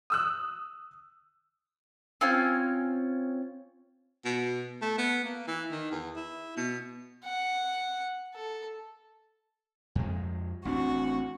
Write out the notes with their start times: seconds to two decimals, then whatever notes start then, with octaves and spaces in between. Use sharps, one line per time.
0.10 D#6 E6 F#6
2.21 C4 C#4 F4 G#5
4.25 B2
4.82 A3
4.98 B3
5.24 A#3
5.48 E3
5.71 D#3
5.92 E2
6.16 E4
6.57 B2
7.25 F#5
8.35 A4
9.95 F2 G#3
10.65 A1 C4 D4 F#4